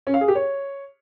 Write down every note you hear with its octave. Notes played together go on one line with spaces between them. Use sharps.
C#4
F5
G#4
G4
C#5